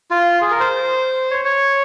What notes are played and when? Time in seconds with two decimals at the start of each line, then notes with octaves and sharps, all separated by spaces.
0.11 F4
0.41 G#4
0.51 A#4
0.60 C5
1.31 C#5
1.45 C#5